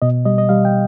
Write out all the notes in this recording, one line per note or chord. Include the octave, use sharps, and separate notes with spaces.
B2 D#5
G3 D#5
D#5
G3 F5
G5